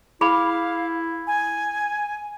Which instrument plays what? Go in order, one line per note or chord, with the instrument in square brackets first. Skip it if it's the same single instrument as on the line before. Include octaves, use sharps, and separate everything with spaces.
[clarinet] E4 [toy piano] G#4 B5 [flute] F5
[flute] G#5